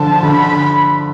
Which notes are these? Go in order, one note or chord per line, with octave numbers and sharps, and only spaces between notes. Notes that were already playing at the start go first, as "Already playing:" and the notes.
Already playing: D3 F3 A5
D3 B5